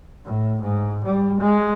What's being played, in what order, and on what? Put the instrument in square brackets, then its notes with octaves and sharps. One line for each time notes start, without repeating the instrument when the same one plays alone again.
[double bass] A2
G#2
G3
G#3